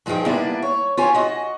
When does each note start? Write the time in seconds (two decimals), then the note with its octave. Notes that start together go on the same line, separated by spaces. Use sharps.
0.06 G2 F3 D#4 F#4 G#4 G5
0.26 G3 A#3 B3 D4 E4 D5
0.62 C#5
0.97 F4 G4 C#5 G#5
1.15 F#4 D#5